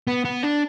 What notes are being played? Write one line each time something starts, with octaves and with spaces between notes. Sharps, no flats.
B3
B3
D4